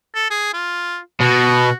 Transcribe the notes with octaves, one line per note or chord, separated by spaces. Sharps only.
A4
G#4
F4
B2 F#4